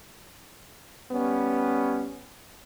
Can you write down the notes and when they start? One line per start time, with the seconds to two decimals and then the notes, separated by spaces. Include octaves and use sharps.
1.12 G3 B3 C#4